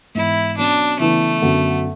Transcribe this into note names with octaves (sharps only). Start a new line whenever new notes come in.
G#2 E3 B3 E4
B2 F#3 C#4 D4
C#3 E3 A3 B3 E4
F#2 D3 F#3 B3